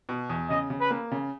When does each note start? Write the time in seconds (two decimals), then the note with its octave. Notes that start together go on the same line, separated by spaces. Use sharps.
0.09 B2
0.30 E2
0.50 C#3 D#5
0.70 C#3
0.81 B4
0.91 A#3
1.12 C#3